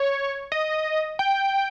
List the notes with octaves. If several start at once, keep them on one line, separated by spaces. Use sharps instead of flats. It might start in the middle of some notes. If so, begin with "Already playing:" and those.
Already playing: C#5
D#5
G5